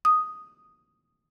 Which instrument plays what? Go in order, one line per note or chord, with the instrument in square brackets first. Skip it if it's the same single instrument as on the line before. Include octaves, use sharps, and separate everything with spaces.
[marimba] D#6